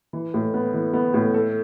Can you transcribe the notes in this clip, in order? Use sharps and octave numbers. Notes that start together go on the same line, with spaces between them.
E3
A2
B3
E3
B3
A2
A4